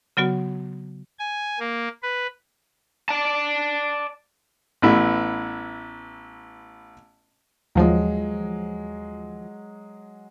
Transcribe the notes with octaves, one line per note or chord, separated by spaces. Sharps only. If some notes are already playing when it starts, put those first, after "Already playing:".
C#3 F#3 B3 F#4
G#5
A#3
B4
D5 A5
A1 B3 E4
D#2 F3 F#3 G#3